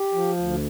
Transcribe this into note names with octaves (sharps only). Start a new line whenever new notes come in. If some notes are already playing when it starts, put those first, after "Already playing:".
Already playing: G4
F3
D2